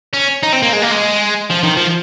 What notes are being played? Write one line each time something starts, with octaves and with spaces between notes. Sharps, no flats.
C#4
D#4
C4
A#3
G#3
A#3
G#3
F3
D#3
F3